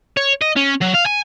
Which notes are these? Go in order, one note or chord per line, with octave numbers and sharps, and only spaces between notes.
C#5
D#5
C#4
F#3
F5
G#5